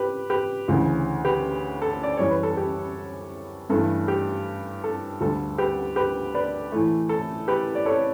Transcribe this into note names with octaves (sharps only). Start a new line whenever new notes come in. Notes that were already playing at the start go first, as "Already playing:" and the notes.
Already playing: G4 B4
G4 B4
D2 C#3 E3
G4 B4
A4
D5
F#2 E3 G3 C#5
B4
A4
G4
G2 E3 A3 A4
G4
A4
D2 D3 G3 A4
G4 B4
G4 B4
B4 D5
A2 E3 A3
A4
G4 B4
D5
A4 C#5